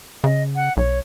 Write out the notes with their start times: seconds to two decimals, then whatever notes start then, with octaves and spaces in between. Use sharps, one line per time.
0.24 C#3 D#5
0.56 F#5
0.77 B1 C#5